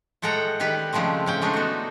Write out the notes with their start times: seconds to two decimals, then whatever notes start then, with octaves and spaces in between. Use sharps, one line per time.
0.22 A2 G#3 A4 F#5 G5 A#5
0.60 D#3 G3 G4 B4
0.93 C#3 F3 G#3 A3 C4
1.26 A2 C#4 G5
1.42 G#3 A3 D4 D#4
1.54 B3 F#4